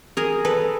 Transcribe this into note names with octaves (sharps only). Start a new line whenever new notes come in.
G#4 A#4
A4 B4